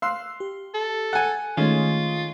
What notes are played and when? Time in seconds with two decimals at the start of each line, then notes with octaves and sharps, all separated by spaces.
0.02 F5 C6 E6 F#6 C7
0.40 G4
0.74 A4
1.13 F#5 G#5
1.57 D#3 G#3 A3 C#4 F4